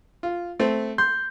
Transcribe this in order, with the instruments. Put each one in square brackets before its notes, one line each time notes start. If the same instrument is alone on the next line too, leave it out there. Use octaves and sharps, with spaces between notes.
[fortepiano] F4
A3 C4
[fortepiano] C6 [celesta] G6